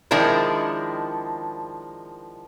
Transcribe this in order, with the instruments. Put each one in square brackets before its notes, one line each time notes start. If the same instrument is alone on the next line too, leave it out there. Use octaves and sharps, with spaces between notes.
[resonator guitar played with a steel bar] D#3 F3 G#3 D4 E4 A#4